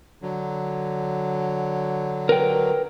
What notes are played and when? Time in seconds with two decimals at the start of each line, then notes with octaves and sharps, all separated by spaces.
0.22 D3 F#3
2.29 A#4 B4 G5